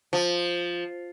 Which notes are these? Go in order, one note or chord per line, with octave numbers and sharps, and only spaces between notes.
F3